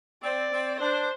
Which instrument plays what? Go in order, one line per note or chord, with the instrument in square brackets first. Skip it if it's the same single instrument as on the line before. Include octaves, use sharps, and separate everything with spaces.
[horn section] C4 [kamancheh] D5
[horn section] C4
[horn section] D4 [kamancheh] C5